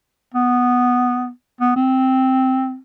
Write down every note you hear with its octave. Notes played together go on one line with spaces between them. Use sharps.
B3
B3
C4